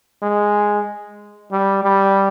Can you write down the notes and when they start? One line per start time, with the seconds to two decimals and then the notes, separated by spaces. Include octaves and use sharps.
0.23 G#3
1.52 G3
1.83 G3